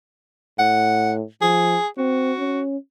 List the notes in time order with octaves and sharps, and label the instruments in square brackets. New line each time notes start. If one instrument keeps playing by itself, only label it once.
[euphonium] A2 [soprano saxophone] F#5
[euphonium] F3 [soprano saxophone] G#4
[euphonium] C4 [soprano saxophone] F#4
[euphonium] C#4